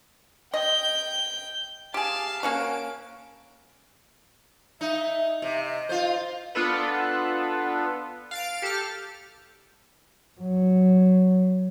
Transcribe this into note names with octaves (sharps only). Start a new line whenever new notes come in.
D#5 G5 G6
G4 G#4 F5 A5
A#3 C#4 F#4 D7
D#4 E5
C3 E5
D#5
F4 C5
B3 D4 F4 A4 B4
F5 A6 D7
G4 A4 A5 F6
F#3